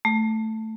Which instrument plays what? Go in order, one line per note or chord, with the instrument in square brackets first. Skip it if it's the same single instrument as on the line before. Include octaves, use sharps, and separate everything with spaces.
[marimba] A3